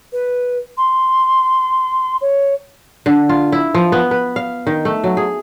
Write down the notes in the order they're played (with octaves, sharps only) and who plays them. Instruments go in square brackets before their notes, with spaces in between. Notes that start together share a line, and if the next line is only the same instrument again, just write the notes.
[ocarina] B4
C6
C#5
[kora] D3
F4
E4
F3
B3
B4
F5
D#3
A3
F#3
G#4